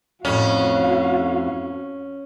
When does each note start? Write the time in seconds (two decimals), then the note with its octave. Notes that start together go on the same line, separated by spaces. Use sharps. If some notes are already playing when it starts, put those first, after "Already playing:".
0.25 F2 A2 C#4 F#4 F5